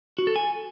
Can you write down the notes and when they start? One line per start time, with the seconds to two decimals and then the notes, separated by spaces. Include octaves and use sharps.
0.18 F#4
0.27 A4
0.36 G#5